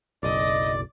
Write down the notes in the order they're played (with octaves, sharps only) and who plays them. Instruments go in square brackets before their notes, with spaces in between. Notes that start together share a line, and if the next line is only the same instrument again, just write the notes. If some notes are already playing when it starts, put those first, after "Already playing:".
[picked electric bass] F#1 B1 [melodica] D5 [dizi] D#5